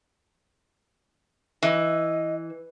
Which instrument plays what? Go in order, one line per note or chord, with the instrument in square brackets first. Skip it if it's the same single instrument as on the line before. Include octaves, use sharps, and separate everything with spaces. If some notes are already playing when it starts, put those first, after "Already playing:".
[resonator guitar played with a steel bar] E3 [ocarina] D#5